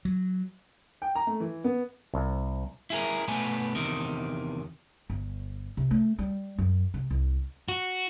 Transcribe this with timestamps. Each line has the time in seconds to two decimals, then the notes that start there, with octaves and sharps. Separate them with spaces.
0.05 F#3
1.02 G5
1.15 A#5
1.27 A3
1.40 E3
1.64 B3
2.14 C2
2.90 E4 G#4 A#4
3.28 B2 A3 B3 G#5
3.75 E2 C3 D#3
5.10 G1
5.77 C3
5.91 A3
6.19 G3
6.59 F#2
6.94 C3
7.10 C2
7.69 F#4